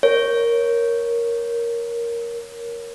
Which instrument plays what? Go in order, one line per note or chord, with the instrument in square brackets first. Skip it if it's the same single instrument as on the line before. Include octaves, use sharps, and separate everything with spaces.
[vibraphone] A#4 [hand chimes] C#5